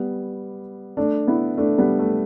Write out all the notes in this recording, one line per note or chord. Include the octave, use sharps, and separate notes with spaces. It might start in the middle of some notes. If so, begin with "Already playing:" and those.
Already playing: G3 B3
A3 D4
B3 E4
A3 D4
G3 B3
A3